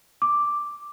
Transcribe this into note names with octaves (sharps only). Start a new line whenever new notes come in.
D6